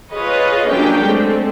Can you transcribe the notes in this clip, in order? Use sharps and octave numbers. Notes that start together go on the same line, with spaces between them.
F4 G#4 B4 C#5 D#5
F#3 A#3 C#4 D4 G4 G5
G#3 A3 C4